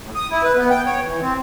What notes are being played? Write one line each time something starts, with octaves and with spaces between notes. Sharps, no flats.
A2
D#6
E4
B4
B3
G5
C#5
E3
C4